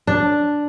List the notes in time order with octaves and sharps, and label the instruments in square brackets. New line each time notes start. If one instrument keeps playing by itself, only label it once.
[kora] D4